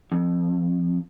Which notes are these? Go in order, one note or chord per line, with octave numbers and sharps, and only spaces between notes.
F2